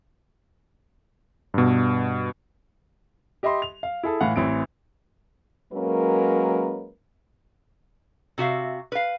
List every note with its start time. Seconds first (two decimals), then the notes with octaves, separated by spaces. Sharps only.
1.54 G2 B2
3.43 G4 D#5 E5 B5 C6
3.62 F7
3.83 F5
4.03 E4 G#4 A4
4.21 A2 E3 F5 F#5
4.36 A1 E3 C4 D7
5.73 F#3 G#3 A#3 C#4 A#4 B4
8.38 C3 F#4 E5 F5
8.92 B4 F5